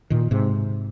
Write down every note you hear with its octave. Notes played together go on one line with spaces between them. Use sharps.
A#2 D#3
G#2 C3